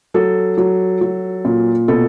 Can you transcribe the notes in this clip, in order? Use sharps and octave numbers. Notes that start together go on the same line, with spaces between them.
F#3 A4
F#3
F#3
A#2
B2 A4